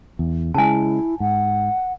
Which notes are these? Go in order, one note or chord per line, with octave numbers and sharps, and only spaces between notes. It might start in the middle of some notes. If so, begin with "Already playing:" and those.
E2
C#3 G#3 E4 G#5 A5
G#2 F#5